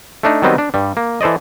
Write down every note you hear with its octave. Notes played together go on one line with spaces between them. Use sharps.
A3 D4 D#4
D#3 F#3 G3 B3 C4 D#5
D4
G2 G3
A#3
E3 A4 C5 D5 D#5